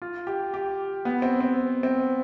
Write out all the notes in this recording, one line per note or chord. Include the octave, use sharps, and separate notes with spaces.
F4
G4
G4
B3
C4
C4
C4